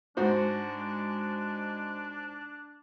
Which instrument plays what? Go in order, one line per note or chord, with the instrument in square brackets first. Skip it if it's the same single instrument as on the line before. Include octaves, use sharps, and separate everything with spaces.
[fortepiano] G#2 F#4 C5 [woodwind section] G#3 [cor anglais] D4